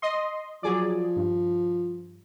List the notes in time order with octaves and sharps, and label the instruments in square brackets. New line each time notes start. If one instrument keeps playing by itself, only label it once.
[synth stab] D#5 C6
[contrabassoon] F3 [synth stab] F#3 G#4 D5
[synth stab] G2